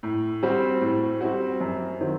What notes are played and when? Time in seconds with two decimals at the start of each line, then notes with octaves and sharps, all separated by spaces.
0.03 A2
0.43 G3 C4 F#4
0.81 A2
1.21 G3 C4 F#4
1.61 F#2
2.00 D#3 F#3 C4 F#4